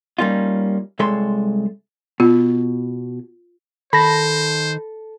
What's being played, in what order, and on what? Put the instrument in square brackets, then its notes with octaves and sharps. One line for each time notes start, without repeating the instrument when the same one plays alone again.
[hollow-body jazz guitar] G3 A#3 C#4 D#4 F4
C2 G#3 A4 C#5 C6
[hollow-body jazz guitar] B2 [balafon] F4
[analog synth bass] D#3 [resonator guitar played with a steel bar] A4 [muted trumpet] C5 [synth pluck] B5 A#6